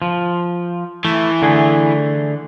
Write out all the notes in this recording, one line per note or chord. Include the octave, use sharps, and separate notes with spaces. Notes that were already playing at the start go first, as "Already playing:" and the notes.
F3
E3 A3
D3 A3 G#4